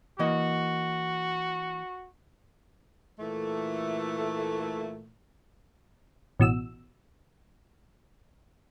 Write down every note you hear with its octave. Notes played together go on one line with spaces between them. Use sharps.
E3 A#3 F#4 D#5
A#2 E3 A3
A1 B2 E6